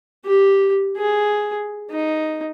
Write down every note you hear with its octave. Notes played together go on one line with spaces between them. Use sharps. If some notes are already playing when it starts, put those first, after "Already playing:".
G4
G#4
D#4